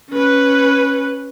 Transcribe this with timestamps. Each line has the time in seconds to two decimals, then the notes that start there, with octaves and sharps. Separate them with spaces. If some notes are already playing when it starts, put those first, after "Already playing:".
0.11 C#4 B4